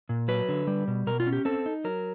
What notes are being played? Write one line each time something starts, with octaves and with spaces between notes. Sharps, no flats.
A#2
F#3 B4
D3
G3
B2
B2 A#4
F4
C#4
G4
C4 A4
D#4
F#3 A#4